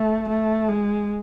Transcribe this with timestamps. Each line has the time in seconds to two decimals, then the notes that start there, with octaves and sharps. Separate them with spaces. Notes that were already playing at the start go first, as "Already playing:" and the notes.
Already playing: A3
0.29 A3
0.68 G#3